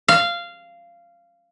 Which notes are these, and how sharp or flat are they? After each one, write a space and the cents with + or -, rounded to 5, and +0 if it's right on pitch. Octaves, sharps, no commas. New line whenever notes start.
F5 -15